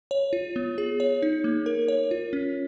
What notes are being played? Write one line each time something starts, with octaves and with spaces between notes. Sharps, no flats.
C#5
F4
B3
G#4
C#5
D#4
A#3
A#4
C#5
F4
C#4